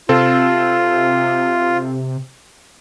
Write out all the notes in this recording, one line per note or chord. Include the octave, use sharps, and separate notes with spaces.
C3 C4 F4 A4